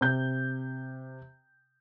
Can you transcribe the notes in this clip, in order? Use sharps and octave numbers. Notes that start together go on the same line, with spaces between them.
C3 G6